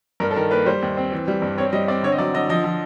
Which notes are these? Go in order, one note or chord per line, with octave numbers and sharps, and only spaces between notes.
G2 A#4
A4
D#3 A#4
A#3 B4
G3 C5
D#2
C4
E3
G3
G2
C4 C#5
G3 D#5
C4 D5
D3 C#5
D#5
F#3 D5
D3 D#5
F3 D#5
F3